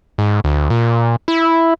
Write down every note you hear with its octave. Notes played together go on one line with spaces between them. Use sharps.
G#2
D2
A#2
E4